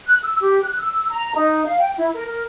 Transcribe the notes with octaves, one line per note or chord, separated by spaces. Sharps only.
F#6
E6
G4
F#6
E6
A#5
D#4
F5
G5
E4
A#4
A#4